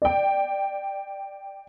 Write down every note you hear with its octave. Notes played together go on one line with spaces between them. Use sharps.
D5 G5